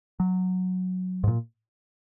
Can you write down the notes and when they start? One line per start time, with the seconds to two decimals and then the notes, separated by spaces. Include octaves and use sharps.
0.20 F#3
1.24 G#2
1.28 A#2